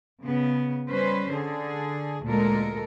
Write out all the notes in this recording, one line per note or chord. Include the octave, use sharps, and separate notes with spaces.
C#3 B3
G3 C#4 B4 C5
D3 G#4
D2 A#2 G#3 A4 A#4